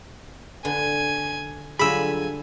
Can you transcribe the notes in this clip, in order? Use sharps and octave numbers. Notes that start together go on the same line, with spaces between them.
D3 B3 G#5
D3 F#3 G3 F4 G#4 G#5 B5 E6